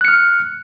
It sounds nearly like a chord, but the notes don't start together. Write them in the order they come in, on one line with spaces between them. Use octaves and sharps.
F#6 C#7 F6